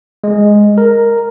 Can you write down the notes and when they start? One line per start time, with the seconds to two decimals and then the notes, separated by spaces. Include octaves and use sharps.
0.24 G#3
0.78 A#4